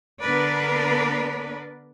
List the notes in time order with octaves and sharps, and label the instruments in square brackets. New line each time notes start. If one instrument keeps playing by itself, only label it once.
[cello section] D3 B3 D4 A#4 B4 D5